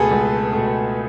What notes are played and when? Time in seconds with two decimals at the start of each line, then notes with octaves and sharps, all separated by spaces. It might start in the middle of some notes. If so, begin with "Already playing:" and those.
Already playing: C#2 B2 A3 G#4 A4 B4
0.11 C#2
0.53 B2 A3